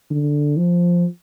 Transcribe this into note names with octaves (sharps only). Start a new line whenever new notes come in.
D3
F3